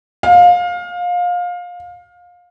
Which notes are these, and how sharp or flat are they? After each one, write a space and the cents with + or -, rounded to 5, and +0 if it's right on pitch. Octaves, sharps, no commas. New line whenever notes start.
F5 +25